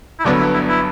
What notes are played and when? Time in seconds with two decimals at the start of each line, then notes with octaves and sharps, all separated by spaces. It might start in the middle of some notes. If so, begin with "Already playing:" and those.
0.19 E4
0.25 G1 G2 D3 F#3 B3 D4
0.40 E4
0.54 E4
0.68 E4